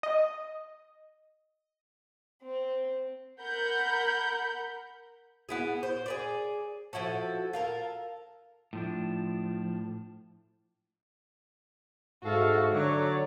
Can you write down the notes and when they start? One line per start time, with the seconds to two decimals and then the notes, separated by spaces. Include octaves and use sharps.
0.03 D#5
2.41 C4
3.41 A#4 F#5 B5 G6
5.49 B3 E4 G#4
5.83 C5
6.06 G#4 B4 D5
6.93 F3 E4 F#4 A4
7.53 F4 A4 A#4
8.73 A2 F3 D4
12.24 G#2 F#4 A4 E5 F5
12.72 D3 F#3 C#5 D5